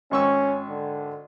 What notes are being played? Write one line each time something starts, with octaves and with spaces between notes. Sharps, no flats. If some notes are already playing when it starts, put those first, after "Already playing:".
G#1 C#4 C#6 E6
D3